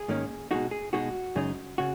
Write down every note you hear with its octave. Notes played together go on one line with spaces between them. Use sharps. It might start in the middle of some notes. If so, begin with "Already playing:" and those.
Already playing: G#4
G#2 D#3 A#3 C#4
B2 G#3 D#4 F#4
G#4
B2 G#3 D#4 F#4
F#2 C#3 G#3 D#4
C#3 F#4